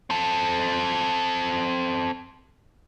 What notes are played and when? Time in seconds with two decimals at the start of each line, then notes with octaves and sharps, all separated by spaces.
0.10 C4 A4